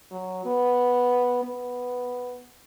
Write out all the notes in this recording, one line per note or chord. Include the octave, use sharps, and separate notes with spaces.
F#3
B3
B3